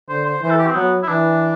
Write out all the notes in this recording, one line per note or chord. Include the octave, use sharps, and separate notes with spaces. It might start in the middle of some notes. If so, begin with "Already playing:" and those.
D3 C5
C5
E3 C5
A4
G4
C4
F#3 B3
E4
E3 D4